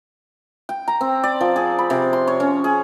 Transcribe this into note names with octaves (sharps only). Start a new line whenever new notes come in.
G5
A#5
C4
D5
F3
G#4
B5
C3
C6
C#5
C#4
G#4